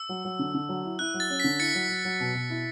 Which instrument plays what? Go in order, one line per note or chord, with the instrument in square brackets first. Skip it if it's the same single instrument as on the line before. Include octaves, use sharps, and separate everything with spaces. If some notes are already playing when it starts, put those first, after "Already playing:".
Already playing: [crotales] E6
[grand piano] F#3
F#3
D3
D3
F#3
E4
[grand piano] E4 [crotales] F#6
[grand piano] F#3
[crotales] A6
[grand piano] C#4
[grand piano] D3 [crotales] B6
[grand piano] E4 [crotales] A6 C#7
[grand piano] F#3
F#3
F#3
B2
B2
E4